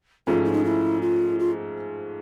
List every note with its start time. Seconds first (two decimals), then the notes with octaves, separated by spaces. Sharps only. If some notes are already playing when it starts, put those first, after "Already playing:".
0.27 G#2 F3 A3 C#4 F4
0.44 E4
0.52 D#4
0.65 E4
1.02 F4
1.39 F4